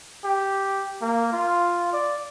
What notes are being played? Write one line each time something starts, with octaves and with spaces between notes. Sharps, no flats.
G4
A#3
F4
D5